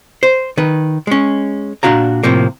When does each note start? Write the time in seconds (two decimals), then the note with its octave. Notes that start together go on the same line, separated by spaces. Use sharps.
0.23 C5
0.57 D#3 B4
1.07 G#3 C#4
1.83 A#2 D4 F#4 F5 A#5
2.23 A2 C3 F3 A#3